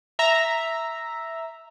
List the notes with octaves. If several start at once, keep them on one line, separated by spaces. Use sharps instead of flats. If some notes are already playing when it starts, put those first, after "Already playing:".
E5 A#5